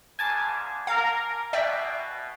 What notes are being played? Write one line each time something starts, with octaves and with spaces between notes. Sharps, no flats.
G#2 C#3 G#5 A5 D6
A#4 F5
B2 D5 E5 G5